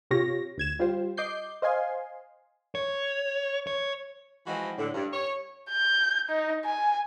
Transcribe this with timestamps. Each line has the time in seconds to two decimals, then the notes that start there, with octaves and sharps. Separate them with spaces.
0.11 C3 F4 G4 C#5 A#6
0.58 D2 G#6 E7
0.79 G3 F4 G4 C5
1.17 D#5 D6 G6 C7
1.62 C5 D#5 F5 G#5 C6
2.75 C#5
3.67 C#5
4.47 E3 F3 G#3 C4 F4 F#4
4.78 A2 D3
4.94 G2
5.13 C#5
5.69 G6
6.30 D#4
6.65 G#5